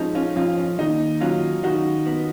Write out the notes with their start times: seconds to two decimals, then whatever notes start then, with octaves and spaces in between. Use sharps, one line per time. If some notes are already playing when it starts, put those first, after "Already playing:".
Already playing: F3 G#3 C#4 D#4
0.15 C#4 F4
0.36 F2 C#4 F4
0.57 C#4
0.79 D#2 D#4
1.21 F#3 C#4 F4
1.63 D#3 D#4 F#4
2.06 B3